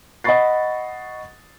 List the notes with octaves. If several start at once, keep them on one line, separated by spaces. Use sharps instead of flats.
D#5 F#5 B5 C#6 A6 C7